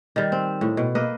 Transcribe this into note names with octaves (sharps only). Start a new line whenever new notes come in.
D#3 G3
C4
A2
B2
A#3 B4 D#5